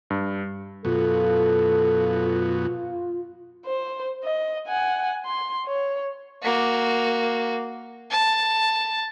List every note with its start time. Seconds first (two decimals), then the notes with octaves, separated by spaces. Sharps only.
0.10 G2
0.85 F#2 B2 F4 A4
3.66 C5
4.24 D#5
4.68 F#5 G#5
5.26 C6
5.66 C#5
6.42 A#3 F#4
8.11 A5